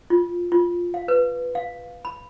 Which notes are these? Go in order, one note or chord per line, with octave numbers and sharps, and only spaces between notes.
F4
F4
F5
B4
F5
B5